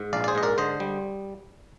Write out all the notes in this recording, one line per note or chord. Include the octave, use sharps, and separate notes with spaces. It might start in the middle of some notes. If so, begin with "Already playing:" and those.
Already playing: G#2
A#1 D5 F5
D5
G#4 C5
G#2 D#5
A#4 D5
D3 C5 D#5
G3